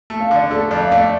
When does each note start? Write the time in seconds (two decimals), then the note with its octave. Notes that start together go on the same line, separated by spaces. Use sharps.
0.10 A3
0.21 F5
0.31 D3 D5
0.51 A3 A4
0.71 F2 D5
0.83 F5
0.92 A3 D5